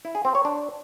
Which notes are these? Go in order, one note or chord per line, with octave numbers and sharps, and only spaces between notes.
E4
G#4
C4
C#5
D4